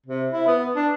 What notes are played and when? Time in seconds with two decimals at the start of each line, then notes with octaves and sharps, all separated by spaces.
0.06 C3
0.31 E4
0.47 B3
0.75 D4